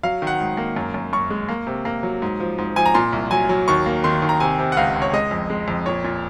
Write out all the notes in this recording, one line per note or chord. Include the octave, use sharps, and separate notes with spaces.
F#3 F5
D#3
F#5
G#2
A#3
F#2
F#2
F#2 C#6
G#3
A#3
C3
A#3
F#3
G#2
F3
G#2
F3 G#5
A#5
A#2 C6
C2
F#3 G#5
F#3
D#2 C#6
A#3
D#3 C6
D#2
A#5
C3 G#5
C3
F#5
C#2 F5
C#2
C#5
G#3 D#5
F2
G#3
F2
A#2 C#5
A#2